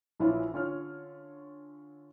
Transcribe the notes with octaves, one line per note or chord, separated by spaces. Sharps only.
A#1 E3 E4 F4 C#5
D3 C#4 F4 C#5 F6